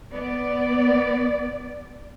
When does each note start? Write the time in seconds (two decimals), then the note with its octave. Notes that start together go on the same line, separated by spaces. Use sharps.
0.11 B3 D5